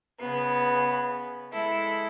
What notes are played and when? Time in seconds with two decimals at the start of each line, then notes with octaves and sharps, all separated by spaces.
0.20 C#3 B3
1.53 G#3 E4 A4